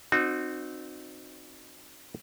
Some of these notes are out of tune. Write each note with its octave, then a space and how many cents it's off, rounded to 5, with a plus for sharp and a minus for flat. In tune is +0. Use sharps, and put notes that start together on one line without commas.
C4 +0 D#4 -30 F#4 -15